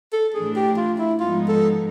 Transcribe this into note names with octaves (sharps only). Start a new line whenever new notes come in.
A4
A2 E3 A3 D4 G#4
G4
F4
E4
G#2 F3 G#3 B3 D#4 F4
A4